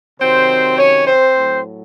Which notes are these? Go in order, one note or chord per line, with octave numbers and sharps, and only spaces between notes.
C3 D#3 F#3 C4 C5
C#4 C#5
C4 C5
A2 F#3